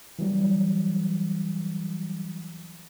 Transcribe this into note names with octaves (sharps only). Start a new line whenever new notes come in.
E3 F#3 G3